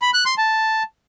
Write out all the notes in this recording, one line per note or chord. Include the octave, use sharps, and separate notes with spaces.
B5
F#6
C6
A5